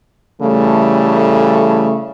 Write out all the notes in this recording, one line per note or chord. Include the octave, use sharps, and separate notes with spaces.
C#3 E3 G3 A3